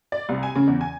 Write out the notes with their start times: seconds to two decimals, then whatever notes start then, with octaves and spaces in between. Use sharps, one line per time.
0.12 D5
0.29 C2
0.43 G#5
0.56 C#3
0.67 E2
0.81 G#5